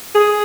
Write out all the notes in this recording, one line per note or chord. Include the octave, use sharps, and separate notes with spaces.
G#4